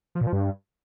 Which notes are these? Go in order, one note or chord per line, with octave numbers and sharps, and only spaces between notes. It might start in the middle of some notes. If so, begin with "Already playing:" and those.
F3
A#2
F3
G2